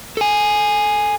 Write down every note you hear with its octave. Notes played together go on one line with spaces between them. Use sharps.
A4 G#5